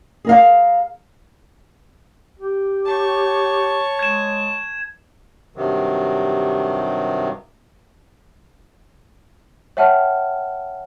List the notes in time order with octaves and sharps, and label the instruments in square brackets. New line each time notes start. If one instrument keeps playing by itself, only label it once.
[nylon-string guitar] G#4 A#4 F5
[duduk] G4
[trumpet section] C#5 [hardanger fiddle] A5 C#6
[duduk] G#3 [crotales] G#6 E7
[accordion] G2 C3 D#3 F#3
[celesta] C#5 E5 F#5 G5 A5 F6